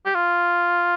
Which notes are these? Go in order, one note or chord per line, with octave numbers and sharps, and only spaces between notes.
G4
F4